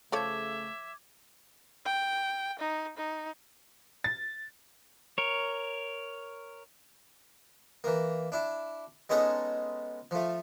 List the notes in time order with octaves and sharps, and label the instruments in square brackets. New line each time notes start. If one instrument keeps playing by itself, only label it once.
[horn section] C#3 A3 [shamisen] F3 A4 C#5 [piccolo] E5 [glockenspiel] D6 G#6
[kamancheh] G5
D#4
D#4
[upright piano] A6
[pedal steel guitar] A#4 C#5
[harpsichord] E3 A#3
D4 E4
G#3 B3 C#4 D#4 G#4 A4
F3 A3